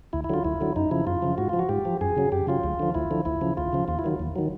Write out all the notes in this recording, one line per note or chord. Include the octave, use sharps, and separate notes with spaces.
D2 E4
E4
D3 F#3 F4
D2 E4
D3 F#3
F#2 D#4
C#3 F3 E4
F#2 F4
C#3 F3
G#2 F#4
F3 F4
F#4
G#2 G4
F3
F#2 G#4
C#3 F#3
F#2 G4
C#3 F#3 F4
D2
D3 F3
D2 E4
D3 F3
D2 E4
C#3 F3
D2 F4
C#3 F3
D#2 F4
E4
D#3 F#3
D#2
D#3 F#3